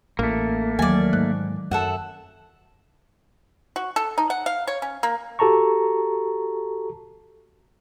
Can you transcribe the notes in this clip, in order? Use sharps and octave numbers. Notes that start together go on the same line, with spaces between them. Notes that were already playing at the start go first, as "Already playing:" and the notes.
A1 A3 A#3
D#2 D#3 E3 F#3 D5 G#5
G#2 F#6
F#2 A4 E5 F#5
F#4
A4
D#4
F#5
F5
C#5
C#4
A#3
F#4 G4 A4 A5 A#5 C#6